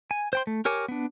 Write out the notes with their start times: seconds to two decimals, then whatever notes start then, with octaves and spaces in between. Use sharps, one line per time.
0.11 G#5
0.33 C5 G5 C6
0.47 A3
0.65 G4 A#4 C#5 G#5 D6
0.88 B3 D4